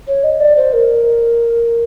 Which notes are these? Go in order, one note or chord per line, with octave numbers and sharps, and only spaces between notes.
C#5
D#5
D5
C5
A#4